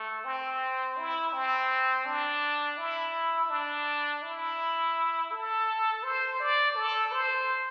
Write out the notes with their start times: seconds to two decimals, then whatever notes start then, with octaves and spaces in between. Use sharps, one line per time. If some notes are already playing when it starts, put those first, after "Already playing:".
Already playing: A3
0.25 C4
0.98 E4
1.33 C4
2.06 D4
2.78 E4
3.50 D4
4.23 E4
5.32 A4
6.03 C5
6.40 D5
6.76 A4
7.12 C5